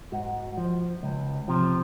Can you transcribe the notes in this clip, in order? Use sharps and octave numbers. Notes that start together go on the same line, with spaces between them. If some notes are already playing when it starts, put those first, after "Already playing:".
G#2 F#4
F3
C#2
C3 F3